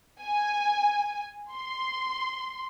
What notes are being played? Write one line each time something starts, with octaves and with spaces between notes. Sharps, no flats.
G#5
C6